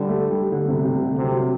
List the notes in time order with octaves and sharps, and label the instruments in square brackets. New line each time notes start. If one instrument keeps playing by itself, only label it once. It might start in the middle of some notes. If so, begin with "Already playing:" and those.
Already playing: [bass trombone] D3 [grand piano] G3
[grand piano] A3
G3
D3
C3
C3
D3
[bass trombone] C3 [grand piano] F#3
[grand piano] F#3